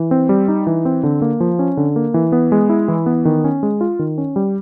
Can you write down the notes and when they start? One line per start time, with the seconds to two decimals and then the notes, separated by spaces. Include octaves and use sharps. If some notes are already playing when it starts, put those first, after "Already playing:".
Already playing: E3
0.11 C4
0.29 G3
0.48 D#4
0.67 E3
0.85 C4
1.04 D3
1.22 A#3
1.40 F3
1.59 C#4
1.77 D3
1.96 A#3
2.14 E3
2.32 B3
2.52 G#3
2.69 E4
2.88 E3
3.06 B3
3.25 D#3
3.44 C#4
3.63 G#3
3.81 F4
3.99 D#3
4.18 C#4
4.36 G3